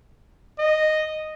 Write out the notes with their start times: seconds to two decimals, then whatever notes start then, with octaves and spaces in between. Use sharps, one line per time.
0.59 D#5